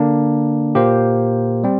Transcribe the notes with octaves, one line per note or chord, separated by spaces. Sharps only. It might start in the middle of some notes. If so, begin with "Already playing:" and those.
Already playing: D3 A#3 D4
A#2 A#3 G4 C5
G3 C4